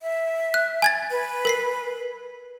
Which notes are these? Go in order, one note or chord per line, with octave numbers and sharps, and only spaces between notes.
E5
F#6
G#5 G#6 A6
B4
A#4 B6 C7